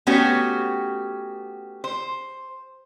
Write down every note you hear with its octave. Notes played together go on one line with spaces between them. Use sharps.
A3 B3 C#4 F#4 G4
C5